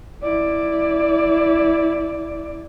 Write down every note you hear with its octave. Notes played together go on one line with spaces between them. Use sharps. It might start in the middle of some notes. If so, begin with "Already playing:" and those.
E4 D5